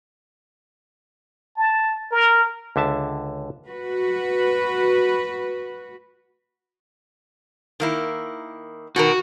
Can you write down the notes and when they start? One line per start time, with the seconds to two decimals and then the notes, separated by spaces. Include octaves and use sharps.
1.56 A5
2.11 A#4
2.76 C#2 D3 E5 A5
3.68 F#4 B4
7.80 D#3 A#3 E4
8.96 B2 D#3 F#4 A#4